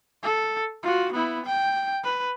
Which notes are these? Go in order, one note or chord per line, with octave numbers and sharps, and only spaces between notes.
A4
F4 F#4
B3 E4
G5
B4